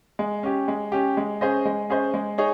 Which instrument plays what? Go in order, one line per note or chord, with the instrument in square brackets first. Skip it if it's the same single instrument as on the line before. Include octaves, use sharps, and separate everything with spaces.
[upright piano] G#3
C#4 G4
G#3
C#4 G4
G#3
C#4 G#4 C5 D#5
G#3
C#4 G#4 C5 D#5
G#3
D#4 G#4 C#5